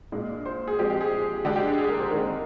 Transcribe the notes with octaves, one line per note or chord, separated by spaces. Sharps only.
A#2 G#3 D4
C5
G#4
F3 G#3 C4 G4
G4
G#4
D3 G#3 D4 G4
G4
G#4
G#4
A#4
C5
D#3 G#3 C4 A#4